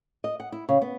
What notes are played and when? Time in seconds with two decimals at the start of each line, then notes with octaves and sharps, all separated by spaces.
0.24 D#5
0.40 F#5
0.52 E4
0.69 C#3
0.82 B3